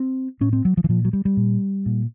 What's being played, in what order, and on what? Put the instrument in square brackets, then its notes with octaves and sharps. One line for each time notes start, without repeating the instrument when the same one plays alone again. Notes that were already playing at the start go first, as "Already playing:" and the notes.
Already playing: [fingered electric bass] C4
A2 C#4
C4
F#3
F3
E3
A#2 F3
F#3
G3
G3
A#2
A#2